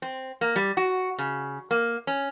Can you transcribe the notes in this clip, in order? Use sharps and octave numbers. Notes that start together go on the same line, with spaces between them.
C4
A#3
G3
F#4
C#3
A#3
C#4